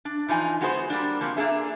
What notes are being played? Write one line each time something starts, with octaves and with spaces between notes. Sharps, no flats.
D4
E3 F3 D#4 G#5
G#3 B3 F#4 G#4 B4 C5
G3 A#3 D4
F3 A#3 C4 C#4
A#3 D4 G#4 E5